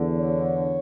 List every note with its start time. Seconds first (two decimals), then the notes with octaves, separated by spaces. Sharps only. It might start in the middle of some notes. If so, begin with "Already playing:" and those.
Already playing: E2 D3
0.16 C#5